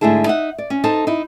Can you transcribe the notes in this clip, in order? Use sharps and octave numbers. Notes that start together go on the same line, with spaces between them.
G#2 D3 A3 E4 G#4 A5
D#4 E5 F#5
D5
C#4
D#4 A4 C5 A5
D#4 E4